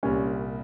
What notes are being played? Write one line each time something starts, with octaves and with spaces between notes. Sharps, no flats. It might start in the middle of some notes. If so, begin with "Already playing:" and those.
C2 A#2 G3 C#4